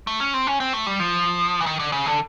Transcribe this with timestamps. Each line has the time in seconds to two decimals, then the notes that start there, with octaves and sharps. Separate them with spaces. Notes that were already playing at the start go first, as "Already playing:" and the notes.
0.07 A3
0.20 C#4
0.34 C4
0.47 C#4
0.60 C4
0.73 A3
0.87 G3
1.00 F3
1.60 E3
1.66 D#3
1.79 D3
1.92 C#3
2.06 D3